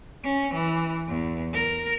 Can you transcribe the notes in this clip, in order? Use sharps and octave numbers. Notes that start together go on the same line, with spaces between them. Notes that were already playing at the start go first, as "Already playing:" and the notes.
C#4
E3
E2
A#4